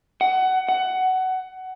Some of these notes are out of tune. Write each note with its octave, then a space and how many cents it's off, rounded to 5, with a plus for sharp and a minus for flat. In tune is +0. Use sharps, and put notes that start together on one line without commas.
F#5 +20
F#5 +15